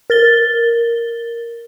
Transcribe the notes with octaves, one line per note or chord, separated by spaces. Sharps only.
A#4 A6 G7